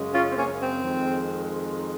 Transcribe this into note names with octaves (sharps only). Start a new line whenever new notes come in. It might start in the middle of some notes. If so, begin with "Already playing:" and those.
Already playing: F#2 C#3 G#3
C#4 F4
C4
A#3 C#4
C4
F2 D#3 G#3